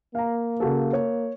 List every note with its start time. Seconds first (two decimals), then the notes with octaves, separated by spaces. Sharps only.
0.15 A#3 F5 A#5
0.60 C#3 F#4 A4
0.93 C#5